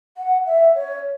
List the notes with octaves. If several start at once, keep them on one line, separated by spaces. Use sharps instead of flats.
F#5
E5
C#5